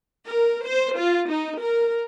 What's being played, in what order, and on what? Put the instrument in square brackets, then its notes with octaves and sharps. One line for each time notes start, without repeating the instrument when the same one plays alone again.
[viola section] A#4
C5
F4
D#4
A#4